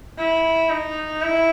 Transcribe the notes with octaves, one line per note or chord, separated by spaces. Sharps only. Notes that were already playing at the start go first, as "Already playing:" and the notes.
E4
D#4
E4